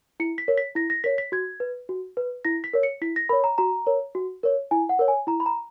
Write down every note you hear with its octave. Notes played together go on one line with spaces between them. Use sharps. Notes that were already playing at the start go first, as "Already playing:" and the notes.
E4 C#7
B6
A#4 C#5
B6
E4 A#6
A#6
A#4 C#5 B6
B6
F#4 G#6
B4
F#4
B4
E4 A#6
B6
A#4 C#5
C#7
E4 B6
A#6
A#4 C#5 B5
A#5
F#4 A#5
A#4 C#5
F#4
A#4 C#5
E4 G#5
F#5
A#4 C#5
G#5
E4 A#5
B5
A#5